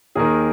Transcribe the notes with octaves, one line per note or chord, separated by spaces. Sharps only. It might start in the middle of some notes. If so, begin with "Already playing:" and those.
D#2 D#3 G#4 A#4